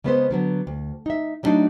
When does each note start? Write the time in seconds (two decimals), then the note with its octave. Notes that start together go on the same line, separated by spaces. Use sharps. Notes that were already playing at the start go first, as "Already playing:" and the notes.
0.04 C#3 G#3 B3 A4 B4 C5
0.31 D3 F#3 B3
0.67 D2
1.06 D#4 E5
1.43 F#3 G3 A3 D4 D#4 F#4